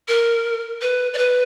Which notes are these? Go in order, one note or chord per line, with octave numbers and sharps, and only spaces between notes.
A#4
B4
D5
B4